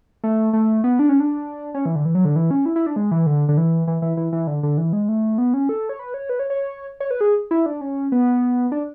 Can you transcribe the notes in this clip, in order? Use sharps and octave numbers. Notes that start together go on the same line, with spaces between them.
A3
A3
B3
D4
C#4
D4
C#4
E3
D3
E3
F#3
D3
E3
C#4
E4
E4
D4
G#3
E3
D3
D3
E3
E3
E3
E3
E3
D3
D3
E3
G#3
A3
B3
C#4
A4
C#5
B4
C#5
B4
C#5
C#5
C#5
B4
G#4
E4
D4
C#4
B3
D4